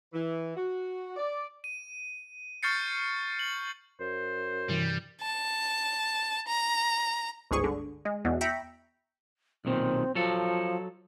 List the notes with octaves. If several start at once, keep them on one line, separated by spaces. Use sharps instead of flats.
E3
F#4
D5
D#7
C#6 F6 G6 A6 C7 C#7
F#7
F#2 C5
G2 C3 E3 G3
A5
A#5
G1 C#2 G#2 G#4 C#6
D3
G#3
E2 B2
E5 G5 A#5 B5 C#6
B1 A#2 D#3 C4
F3 F#3 A4